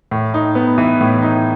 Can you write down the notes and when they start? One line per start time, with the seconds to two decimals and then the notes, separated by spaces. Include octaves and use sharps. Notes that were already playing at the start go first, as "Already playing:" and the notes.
0.11 A2
0.34 D#4
0.55 B3
0.78 E3
1.01 A2
1.22 D#4